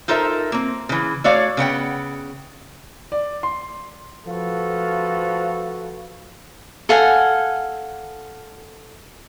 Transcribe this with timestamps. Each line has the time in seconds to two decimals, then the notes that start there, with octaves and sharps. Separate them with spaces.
0.08 D#4 F4 A4 A#4 C5 E5
0.52 A#3 C4
0.89 C#3 E3
1.24 A3 F#4 C#5 D5 F5
1.57 C#3 B3 F#5 G5
3.12 D5
3.43 C6
4.27 F3 A3 F#4 A4 B4 F5
6.89 A4 F5 F#5 G#5